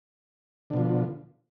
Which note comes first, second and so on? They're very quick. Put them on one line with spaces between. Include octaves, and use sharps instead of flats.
D3 B2 F3